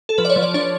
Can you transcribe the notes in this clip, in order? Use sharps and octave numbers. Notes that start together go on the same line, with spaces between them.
A4
F3 B4
D5
C#5
F3
D5
D4 C#5